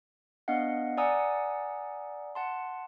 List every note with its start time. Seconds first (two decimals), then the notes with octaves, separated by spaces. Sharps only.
0.48 B3 D4 D#5 F5 F#5
0.97 D5 F#5 G#5 A#5 D#6 E6
2.35 F#5 A5 C6